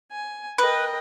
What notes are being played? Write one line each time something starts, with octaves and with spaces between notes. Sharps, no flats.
G#5
A#4 B4 D#5 G5